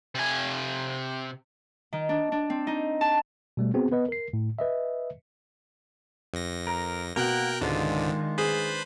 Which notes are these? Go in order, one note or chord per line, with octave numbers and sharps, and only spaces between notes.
C3 G#5
D#3
D4
D4
C4
D#4
A5
B2 G3 A3
B3 C4 F#4 G#4
B3 B4 D#5
A#4 C7
A2
B4 D#5 E5
F2 A#6
A#4
B2 A#3 A#4 F#5 G5 F#6
C#2 G#2 D3 D#3 G#3 D4 F4
G#4 B4 C5 B5